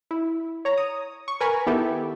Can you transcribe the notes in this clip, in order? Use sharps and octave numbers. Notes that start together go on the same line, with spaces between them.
E4
C#5 A#5
D#6
C#6
A#4 B4 G#5 A#5 B5 C#6
D#3 B3 E4 G4 A4